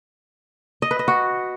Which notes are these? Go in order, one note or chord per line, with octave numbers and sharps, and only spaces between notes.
D#5
B4
D#5
F#4